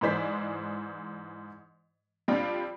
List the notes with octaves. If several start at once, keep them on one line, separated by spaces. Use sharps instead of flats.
G#2 E3 G#3 C5 D5 B6
F3 G3 C4 D4 F4